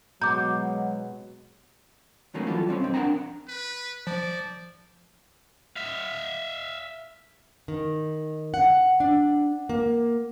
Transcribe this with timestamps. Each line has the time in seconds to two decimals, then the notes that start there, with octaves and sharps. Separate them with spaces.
0.21 B2 F#3 G#3 A#5 D6 G6
2.34 D#3 F#3 A3 A#3 C#4
2.47 E3 F#3 G3 F4 G4 A4
2.68 G3 C4 C#4
2.80 B1 F2 C4
2.94 F3 D4 A#4 F#5 G5 A#5
3.48 B4
4.07 F3 D5
5.76 E5 F5
7.68 D#3
8.54 F#5
9.00 D4
9.69 A#3